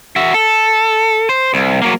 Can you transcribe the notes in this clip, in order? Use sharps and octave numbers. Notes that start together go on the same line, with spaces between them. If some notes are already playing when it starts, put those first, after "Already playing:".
F#4 E5
A4
C5
C2
F#3 A#3